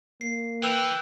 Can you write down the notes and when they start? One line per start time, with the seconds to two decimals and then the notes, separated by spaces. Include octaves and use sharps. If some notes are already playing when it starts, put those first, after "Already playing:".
0.21 A#3 C7
0.63 E3 E4 B4 G5 E6 F7